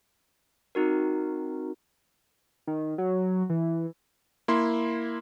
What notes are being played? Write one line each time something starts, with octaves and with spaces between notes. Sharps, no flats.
C4 D#4 F#4 A#4
D#3
F#3
E3
A#3 E4 C6